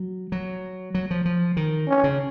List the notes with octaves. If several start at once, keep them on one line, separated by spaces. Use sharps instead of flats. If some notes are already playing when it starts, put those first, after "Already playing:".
Already playing: F#3
F#3
F#3
F3
F3
D#3
C#4
C#3